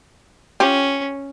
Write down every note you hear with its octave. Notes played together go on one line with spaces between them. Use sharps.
C#4 F4 G4